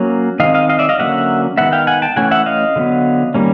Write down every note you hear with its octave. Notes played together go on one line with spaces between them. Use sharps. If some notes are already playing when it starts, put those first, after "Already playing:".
Already playing: F#3 A#3 C#4
D#3 G#3 C4 D#5 F5
D#5 F5
D#5 F5
D5 E5
D#5 F5
D3 F#3 A#3 C#4 E5 F#5
D#3 G#3 B3 E5 F#5
F5 G5
F#5 G#5
G5 A5
E3 A3 C#4 F#5 G#5
E5 F#5
D#5 F5
D3 F#3 B3
D#3 G3 A#3 C#4